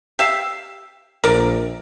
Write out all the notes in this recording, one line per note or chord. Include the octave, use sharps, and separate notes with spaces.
G4 E5 F5
A#1 A#4 D5